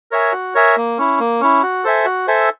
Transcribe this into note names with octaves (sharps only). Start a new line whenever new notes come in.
A#4 C#5 E5 G#5
F#4
A#4 C#5 E5 G#5
A#3
C#4 E4
A#3
C#4 E4
F#4
A4 C5 E5 G#5
F#4
A4 C5 E5 G#5